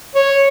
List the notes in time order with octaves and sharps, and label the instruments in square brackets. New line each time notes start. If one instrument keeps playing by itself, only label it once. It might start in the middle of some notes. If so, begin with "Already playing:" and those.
[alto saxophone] C#5